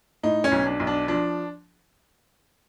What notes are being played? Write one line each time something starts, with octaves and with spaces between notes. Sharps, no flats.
A2 D#4
C#4
B1
D4
B1
D4
F3 D4